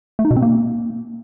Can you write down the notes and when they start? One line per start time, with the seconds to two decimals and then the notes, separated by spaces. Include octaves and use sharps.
0.19 A3
0.25 D#4
0.31 B2
0.37 C4
0.42 A#3